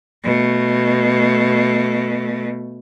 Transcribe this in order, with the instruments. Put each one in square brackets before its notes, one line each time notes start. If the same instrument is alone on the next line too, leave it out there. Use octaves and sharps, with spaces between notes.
[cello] B2 A3